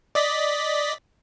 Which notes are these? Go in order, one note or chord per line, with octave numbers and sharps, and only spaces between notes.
D5 D#5 B6